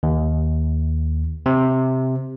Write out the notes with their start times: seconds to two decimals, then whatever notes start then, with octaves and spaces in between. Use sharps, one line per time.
0.03 D#2
1.46 C3